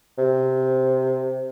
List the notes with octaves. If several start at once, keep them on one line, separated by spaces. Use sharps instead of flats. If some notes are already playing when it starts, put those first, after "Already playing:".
C3